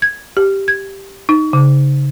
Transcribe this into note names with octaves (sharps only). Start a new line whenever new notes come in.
G#6
G4
G#6
D#4
C#3